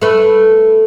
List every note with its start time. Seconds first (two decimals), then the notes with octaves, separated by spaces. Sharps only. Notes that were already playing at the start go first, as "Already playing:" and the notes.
0.02 A3 B4